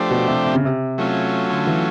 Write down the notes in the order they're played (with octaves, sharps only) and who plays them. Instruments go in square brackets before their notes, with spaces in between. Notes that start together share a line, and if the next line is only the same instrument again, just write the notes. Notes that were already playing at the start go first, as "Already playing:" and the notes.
Already playing: [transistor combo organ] F3 A3 D4 G4 C5
[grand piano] B2
C3
C3
C#3
C3
[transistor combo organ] F#3 A3 C#4 F4
[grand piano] D3
E3